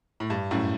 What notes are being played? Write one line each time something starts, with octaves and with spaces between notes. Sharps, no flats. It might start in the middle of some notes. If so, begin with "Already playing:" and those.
A2
G2
F#2 A2